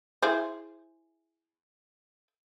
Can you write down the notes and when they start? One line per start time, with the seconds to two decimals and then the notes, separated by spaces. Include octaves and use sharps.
0.22 E4 G#4 C5